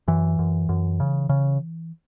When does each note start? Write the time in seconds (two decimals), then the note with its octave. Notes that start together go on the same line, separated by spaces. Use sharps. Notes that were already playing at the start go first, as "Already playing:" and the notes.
0.08 F#2 E3
0.39 F#2
0.69 F#2
1.00 C#3
1.29 C#3